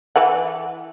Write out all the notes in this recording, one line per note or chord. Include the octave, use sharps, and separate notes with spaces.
E3 B4 F#5